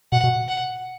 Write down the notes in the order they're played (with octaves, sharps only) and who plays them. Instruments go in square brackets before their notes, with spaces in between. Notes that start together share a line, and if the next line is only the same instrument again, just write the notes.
[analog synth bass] B2 [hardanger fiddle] F#5
[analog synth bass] B2
[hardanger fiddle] F#5